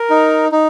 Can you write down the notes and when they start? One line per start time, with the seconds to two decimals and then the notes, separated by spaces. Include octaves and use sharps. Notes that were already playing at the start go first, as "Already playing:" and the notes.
Already playing: A#4
0.10 D#4
0.52 D#4